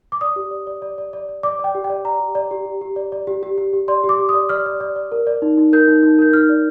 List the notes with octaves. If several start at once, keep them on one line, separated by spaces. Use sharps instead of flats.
D6
D5 D#6
G4
D5
D5
D5
D5
D5
D5
D5 D6
D5 G5
G4
G5
D5
D5 A#5
G4
D5
G4
G4
G4
D5
D5
G4
G4
G4
G4
D5 C6
G4
D6
G4
D#6
D5
D5 F6
D5
D5
D5
A#4
D5
D#4
D#4
A#4 G6
D#4
D#4
A#4 G6
D#4 F6
D5